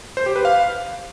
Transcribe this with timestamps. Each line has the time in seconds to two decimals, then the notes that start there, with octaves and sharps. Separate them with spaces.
0.17 C5
0.26 G4
0.36 B4
0.45 F5